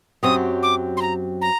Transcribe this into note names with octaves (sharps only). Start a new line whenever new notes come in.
F#2 F#3 C4 G4 D#6
D6
C6
A#5
A#5